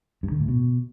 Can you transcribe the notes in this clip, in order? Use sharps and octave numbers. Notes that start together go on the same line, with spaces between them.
G2
D3
A2
B2